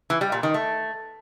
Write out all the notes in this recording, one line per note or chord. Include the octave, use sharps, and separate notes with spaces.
E3
G3
A#2
D#3
A3